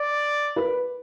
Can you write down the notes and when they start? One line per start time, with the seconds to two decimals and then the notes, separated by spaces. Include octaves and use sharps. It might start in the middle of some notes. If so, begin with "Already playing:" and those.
Already playing: D5
0.56 B4